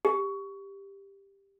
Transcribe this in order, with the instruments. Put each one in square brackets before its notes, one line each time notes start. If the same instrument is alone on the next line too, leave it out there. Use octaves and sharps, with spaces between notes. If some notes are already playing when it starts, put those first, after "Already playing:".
[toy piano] G4